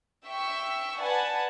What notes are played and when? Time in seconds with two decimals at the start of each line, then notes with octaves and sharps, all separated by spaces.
0.25 E5 G5 C#6 E6
1.01 B4 D5 F#5 G#5 A5